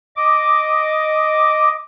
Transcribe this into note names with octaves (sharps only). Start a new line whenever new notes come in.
D#5 D6